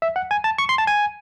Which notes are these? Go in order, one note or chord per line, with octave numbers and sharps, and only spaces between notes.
E5
F#5
G#5
A5
C#6
C6
A5
G#5